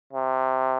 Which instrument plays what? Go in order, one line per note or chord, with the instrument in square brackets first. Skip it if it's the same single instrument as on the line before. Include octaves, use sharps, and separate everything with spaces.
[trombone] C3